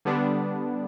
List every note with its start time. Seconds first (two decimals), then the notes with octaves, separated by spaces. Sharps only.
0.05 D3 G3 B3 D4